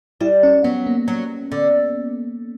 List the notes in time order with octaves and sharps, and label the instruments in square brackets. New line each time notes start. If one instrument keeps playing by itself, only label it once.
[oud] G3 [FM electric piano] E4
[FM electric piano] C#4
[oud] F#3 [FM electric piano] B3
[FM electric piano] A#3
[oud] F#3
D3